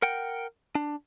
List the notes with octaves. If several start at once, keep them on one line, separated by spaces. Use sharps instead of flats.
A#4 F#5 G5
D4